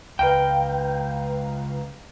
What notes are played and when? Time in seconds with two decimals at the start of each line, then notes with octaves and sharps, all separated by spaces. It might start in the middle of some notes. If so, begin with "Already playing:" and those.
0.19 C#2 B4 F5 G5 A#5